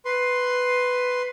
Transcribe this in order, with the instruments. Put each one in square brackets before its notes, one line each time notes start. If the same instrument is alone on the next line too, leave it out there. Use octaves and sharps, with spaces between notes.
[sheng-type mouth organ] B4 C6